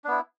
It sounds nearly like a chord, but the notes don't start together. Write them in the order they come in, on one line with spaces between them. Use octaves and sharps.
D4 B3 E4